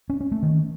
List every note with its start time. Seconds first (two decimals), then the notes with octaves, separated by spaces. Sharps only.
0.10 C#4
0.21 C#4
0.32 A3
0.43 D#3